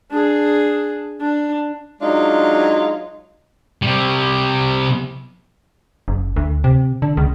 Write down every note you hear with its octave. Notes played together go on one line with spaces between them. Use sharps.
D4 G#4
D4
F#3 G#3 D4 D#4 F4
C3 G3
F#1
D2
C3
D3
C#2